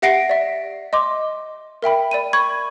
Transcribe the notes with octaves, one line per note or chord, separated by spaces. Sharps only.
G4 E5 F#5 A#6 C7 D7
D5 E5
D#5 C6 D6
A#4 E5 G5 B5
D5 B5 D#7
B5 C#6 G#6